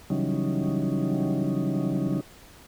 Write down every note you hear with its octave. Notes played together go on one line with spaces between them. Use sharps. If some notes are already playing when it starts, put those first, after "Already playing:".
C#3 E3 F#3 G3 C#4 D#4